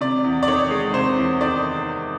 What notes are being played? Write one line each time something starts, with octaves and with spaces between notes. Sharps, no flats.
C3 D5
E2
D5
D#3 C#5
G#3
C3 C5
E2
D#3 D5